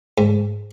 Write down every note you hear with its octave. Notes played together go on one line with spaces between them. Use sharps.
G#2